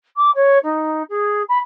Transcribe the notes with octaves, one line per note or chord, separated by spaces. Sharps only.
D6
C#5
D#4
G#4
B5